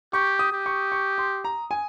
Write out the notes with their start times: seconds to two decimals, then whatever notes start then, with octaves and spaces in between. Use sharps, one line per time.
0.13 G4 C#6
0.39 D#6
0.53 G4
0.66 C#6
0.92 C#6
1.18 C6
1.44 A#5
1.71 G#5